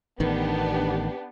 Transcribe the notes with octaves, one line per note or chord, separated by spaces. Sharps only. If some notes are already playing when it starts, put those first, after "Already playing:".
A1 D#3 B3 D4 G4